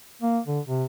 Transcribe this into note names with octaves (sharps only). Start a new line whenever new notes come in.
A#3
D3
C3